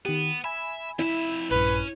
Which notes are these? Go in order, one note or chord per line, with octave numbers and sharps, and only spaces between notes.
D#3 B3 G4
E5 G#5 B5
F2 E4 E5
A#1 G2 C#4 B4